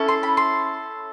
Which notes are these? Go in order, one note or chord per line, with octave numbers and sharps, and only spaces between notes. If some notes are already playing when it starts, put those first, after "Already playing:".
Already playing: C#4 E4 A4
C6
B5
C6